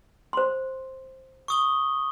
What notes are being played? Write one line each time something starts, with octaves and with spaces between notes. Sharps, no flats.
C5 C6
C#6 D#6 G7